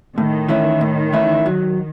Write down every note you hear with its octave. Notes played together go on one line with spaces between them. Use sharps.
A2 D#3
E3 A3 C#4 E4
A2
E3 A3 C#4 E4
F#3